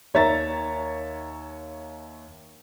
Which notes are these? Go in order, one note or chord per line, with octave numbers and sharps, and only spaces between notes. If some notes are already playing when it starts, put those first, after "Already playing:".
D#2 C#5 E5 A#5 A6